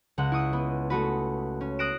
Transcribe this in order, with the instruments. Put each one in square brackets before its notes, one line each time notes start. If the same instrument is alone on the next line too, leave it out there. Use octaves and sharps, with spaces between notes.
[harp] C#2 G#3 F#5
E4 C#6 D#6
B3
A3 F#4 B4
C#4
D#6 F#6 A#6 C7 D7 E7